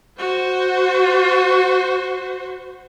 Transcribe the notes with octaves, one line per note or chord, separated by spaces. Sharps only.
F#4 C5